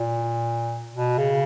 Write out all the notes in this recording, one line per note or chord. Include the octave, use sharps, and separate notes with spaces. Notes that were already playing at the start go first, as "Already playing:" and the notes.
Already playing: A#2
B2
C#3